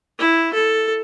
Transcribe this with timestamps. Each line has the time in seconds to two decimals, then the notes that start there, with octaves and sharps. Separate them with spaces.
0.19 E4
0.54 A4